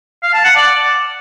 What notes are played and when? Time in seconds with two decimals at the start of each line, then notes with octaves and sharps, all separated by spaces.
0.23 F5
0.34 A5
0.44 F#5
0.55 D5